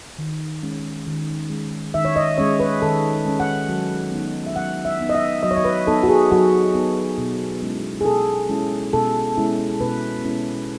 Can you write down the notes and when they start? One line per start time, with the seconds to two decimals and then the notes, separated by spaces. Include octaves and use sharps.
0.19 D#3
0.63 G#3 C#4
1.07 D#3
1.50 G#3 C#4
1.94 D#3 E5
2.05 C#5
2.16 D#5
2.38 G#3 C#4 C#5
2.60 B4
2.82 D#3 A4
3.25 G#3 C#4
3.40 F#5
3.69 F#3
4.12 B3 D#4
4.46 E5
4.56 F#3 F#5
4.85 E5
5.00 B3 D#4
5.10 D#5
5.15 E5
5.43 F#3 D#5
5.51 C#5
5.57 D#5
5.65 B4
5.87 B3 D#4 A4
6.03 F#4
6.08 G#4
6.31 F#3 F#4
6.75 B3 D#4
7.18 B2
7.62 G#3 C#4 E4
8.01 G#4
8.05 B2 A4
8.49 G#3 C#4 E4
8.93 B2 A4
9.37 G#3 C#4 E4
9.80 B2 B4
10.24 G#3 C#4 E4